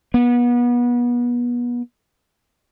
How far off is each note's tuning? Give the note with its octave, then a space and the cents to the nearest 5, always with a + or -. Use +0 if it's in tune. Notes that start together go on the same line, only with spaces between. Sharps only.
B3 -30